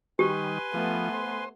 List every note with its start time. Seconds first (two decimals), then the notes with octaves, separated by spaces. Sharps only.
0.19 D#3 G3 G4 B4 G#5 C6
0.74 F3 A3 B3
1.13 C5